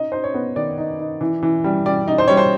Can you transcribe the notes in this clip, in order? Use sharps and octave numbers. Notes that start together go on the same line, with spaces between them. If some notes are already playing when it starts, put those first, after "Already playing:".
Already playing: D#4 D#5
D#4 C5
C#5
B3
D#3 D5
D#4
D#4
E3
E3
G3
G3 D5
D#4
C5
G3 C#5
C5